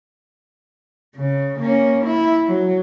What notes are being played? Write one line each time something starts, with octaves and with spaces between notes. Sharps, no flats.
C#3
A#3 C#4
E4
F#3